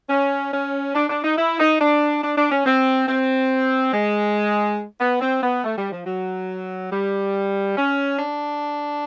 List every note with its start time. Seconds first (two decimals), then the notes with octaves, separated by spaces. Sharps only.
0.09 C#4
0.52 C#4
0.95 D4
1.09 D4
1.23 D#4
1.37 E4
1.58 D#4
1.80 D4
2.22 D4
2.36 D4
2.51 C#4
2.66 C4
3.08 C4
3.93 G#3
4.99 B3
5.21 C4
5.42 B3
5.64 A3
5.78 G3
5.91 F3
6.05 F#3
6.91 G3
7.76 C#4
8.19 D4